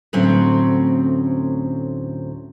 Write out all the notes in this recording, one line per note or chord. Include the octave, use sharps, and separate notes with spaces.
D2 A2 F#3 C4 C#4 F#5